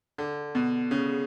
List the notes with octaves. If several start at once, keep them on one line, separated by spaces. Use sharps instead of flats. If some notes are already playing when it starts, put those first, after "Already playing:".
D3
B2
C#3